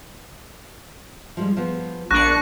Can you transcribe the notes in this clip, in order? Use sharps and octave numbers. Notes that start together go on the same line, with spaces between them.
F3 G3 G#3
F3 B3
A#1 A#3 D4 A5 C#6 F#6 A#6 C#7